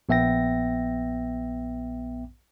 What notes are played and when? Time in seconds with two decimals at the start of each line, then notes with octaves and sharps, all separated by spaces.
0.09 A#1 B3 E5 G5 A#6